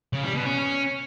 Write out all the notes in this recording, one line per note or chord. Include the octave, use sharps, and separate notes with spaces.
C#3
G3
B2
C#4